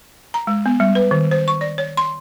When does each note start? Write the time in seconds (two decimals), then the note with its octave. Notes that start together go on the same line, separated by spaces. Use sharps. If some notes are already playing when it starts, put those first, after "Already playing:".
0.34 A#5
0.47 G#3
0.66 B3
0.80 G3
0.95 B4
1.11 D#3
1.31 C5
1.48 C#6
1.61 D5
1.78 C#5
1.97 C6